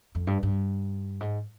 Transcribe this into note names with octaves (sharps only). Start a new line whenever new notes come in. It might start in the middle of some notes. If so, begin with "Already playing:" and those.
F2
G2
G2
G#2